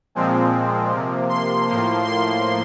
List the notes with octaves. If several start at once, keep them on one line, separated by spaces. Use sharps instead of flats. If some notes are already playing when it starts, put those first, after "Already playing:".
A#2 F3 G#3 C4
C3 F3 A#3
C6
A2 F3 A#3
C6